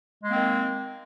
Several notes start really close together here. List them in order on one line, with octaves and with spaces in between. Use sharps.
G#3 A#3 C4 D#3